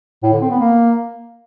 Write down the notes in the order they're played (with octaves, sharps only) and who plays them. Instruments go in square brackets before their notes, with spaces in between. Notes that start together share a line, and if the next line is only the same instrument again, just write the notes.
[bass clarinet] A2
D3
C4
B3
A#3